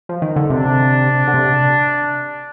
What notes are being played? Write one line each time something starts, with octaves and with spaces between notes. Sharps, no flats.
F3
D#3
D3
C3 D4
D3
C3